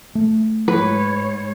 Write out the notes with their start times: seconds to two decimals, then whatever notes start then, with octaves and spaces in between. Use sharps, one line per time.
0.15 A3
0.68 G#2 B4 C#5